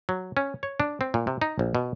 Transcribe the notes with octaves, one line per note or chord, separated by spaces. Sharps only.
F#3
C#4
C#5
D4
C4
A#2
C3
D#4
A#1
B2